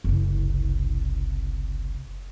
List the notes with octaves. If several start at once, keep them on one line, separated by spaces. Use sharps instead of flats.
F#1 C2